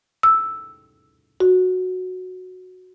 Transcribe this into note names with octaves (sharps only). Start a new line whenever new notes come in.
E6
F#4